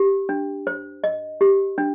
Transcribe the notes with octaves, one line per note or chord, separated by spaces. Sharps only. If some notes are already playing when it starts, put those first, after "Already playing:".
Already playing: G4
D4
C5
D#5
G4
D4